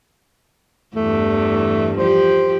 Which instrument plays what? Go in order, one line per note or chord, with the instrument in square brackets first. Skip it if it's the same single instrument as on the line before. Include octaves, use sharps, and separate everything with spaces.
[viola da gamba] E2 G2 E3 [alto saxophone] A3
[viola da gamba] F3 G4 [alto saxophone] C5